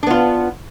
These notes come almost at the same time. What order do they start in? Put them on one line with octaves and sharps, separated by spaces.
D4 B3 F4